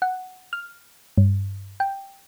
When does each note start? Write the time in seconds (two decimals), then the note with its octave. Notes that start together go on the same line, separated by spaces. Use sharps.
0.02 F#5
0.53 F6
1.18 G2
1.80 G5